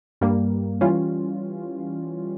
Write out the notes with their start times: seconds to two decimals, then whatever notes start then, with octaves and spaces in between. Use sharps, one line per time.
0.21 G2 G3 A#3
0.81 E3 G3 C#4 F4